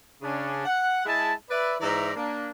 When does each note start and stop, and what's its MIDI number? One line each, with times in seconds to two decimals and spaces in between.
0.22 0.64 49
0.22 0.64 61
0.22 0.64 62
0.66 1.03 78
1.06 1.33 56
1.06 1.33 64
1.06 1.33 81
1.50 1.75 71
1.50 1.75 74
1.50 1.75 76
1.80 2.11 44
1.80 2.11 52
1.80 2.11 74
1.80 2.11 76
1.80 2.11 82
2.15 2.51 58
2.15 2.51 62